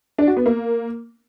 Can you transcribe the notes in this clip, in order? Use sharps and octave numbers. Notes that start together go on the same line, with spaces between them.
D4
F#4
B3
A#3